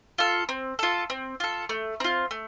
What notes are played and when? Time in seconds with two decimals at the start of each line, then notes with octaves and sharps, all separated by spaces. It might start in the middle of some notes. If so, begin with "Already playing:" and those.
0.18 F4 A4
0.49 C4
0.79 F4 A4
1.10 C4
1.40 F4 A4
1.69 A3
2.00 C4 F4
2.31 A3